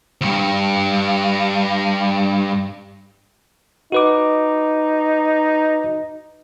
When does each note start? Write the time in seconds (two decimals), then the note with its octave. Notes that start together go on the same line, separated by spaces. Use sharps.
0.21 D2 G2
3.92 D#4 F#4 B4 D6